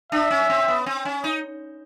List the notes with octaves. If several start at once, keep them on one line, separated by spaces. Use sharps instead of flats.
D4 E5
C#4
C4
B3
C4
C#4
D#4